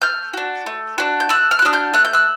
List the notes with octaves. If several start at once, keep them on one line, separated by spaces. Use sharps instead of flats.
A3 F6 G6
D4 F#4
A3
D4 F#4
G6
A3 E6 F#6
F6
F#6
D4 F#4 D#6 F6
F6 G6
A3 F#6
G6
E6 F#6